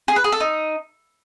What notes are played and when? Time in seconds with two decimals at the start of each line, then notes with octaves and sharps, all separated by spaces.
0.08 G#4
0.16 B4
0.24 G#4
0.32 A4
0.40 D#4